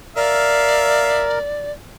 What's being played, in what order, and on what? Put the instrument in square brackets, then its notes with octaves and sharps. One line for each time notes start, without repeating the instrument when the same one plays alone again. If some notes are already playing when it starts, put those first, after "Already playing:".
[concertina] A#4 [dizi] D5 [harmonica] E5 F5